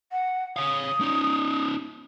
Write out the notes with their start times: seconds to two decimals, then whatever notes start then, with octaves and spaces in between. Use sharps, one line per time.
0.12 F#5
0.56 C#5 F5 D#6
1.01 C#4 D#4